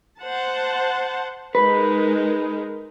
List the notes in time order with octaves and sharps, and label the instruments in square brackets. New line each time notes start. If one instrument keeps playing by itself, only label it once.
[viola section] C5 F#5 A5
[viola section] G#3 D#4 A#4 [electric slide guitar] B4